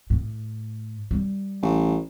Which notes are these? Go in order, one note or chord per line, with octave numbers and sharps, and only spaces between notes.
A2
G3
A1